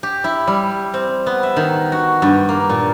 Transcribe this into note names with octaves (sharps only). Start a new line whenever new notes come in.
G4
E4
G3
C4
B3
E5
D#3
F#4
G2
A#3
A#2